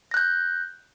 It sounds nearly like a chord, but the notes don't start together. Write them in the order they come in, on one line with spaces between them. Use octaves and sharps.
A#6 F#6 G6